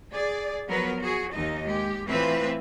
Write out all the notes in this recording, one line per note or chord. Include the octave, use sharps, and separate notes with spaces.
G#4 D5
F3 F#3 B3 A#4 B4
F#4 G#4
D#2 D#4 D#5
G#3 G4
A2 E3 C4 F4 B4 E5